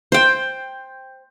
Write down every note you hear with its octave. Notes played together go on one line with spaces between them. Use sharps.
C5 G5